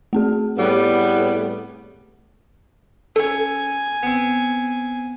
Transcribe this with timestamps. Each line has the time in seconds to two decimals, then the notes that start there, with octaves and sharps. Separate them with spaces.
0.13 A3 C4 G#4
0.58 A2 G3 B3
3.16 C#4 A4 G#5
4.03 B3 C4